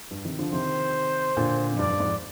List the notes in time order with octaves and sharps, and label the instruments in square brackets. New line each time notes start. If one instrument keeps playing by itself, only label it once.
[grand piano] G2
C3 D#3
D3 F3
[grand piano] C3 D#3 [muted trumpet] C5
[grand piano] A#2 D3
F2
[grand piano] G2 [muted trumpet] D5
[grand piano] G2
F2 G#2